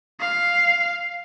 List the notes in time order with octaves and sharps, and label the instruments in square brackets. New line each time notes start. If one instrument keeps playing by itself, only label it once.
[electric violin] F5